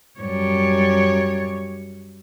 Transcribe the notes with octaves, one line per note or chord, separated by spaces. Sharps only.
F#2 G3 C#5